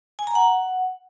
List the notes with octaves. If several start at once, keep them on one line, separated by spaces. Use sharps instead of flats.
G#5
A#5
F#5